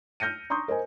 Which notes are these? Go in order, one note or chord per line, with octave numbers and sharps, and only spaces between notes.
F6 G6 A#6 C#7 D#7
A#5 C6 C#6 D#6 G6
A#4 C5 D#5 G#5